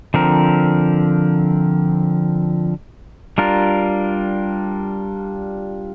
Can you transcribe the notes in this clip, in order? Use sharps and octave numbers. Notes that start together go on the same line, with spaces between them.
D3 F3 C4 A#4
G3 D4 F4 A#4